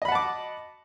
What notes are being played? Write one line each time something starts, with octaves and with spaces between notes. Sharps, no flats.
D#5 F#5 A5 B5 D6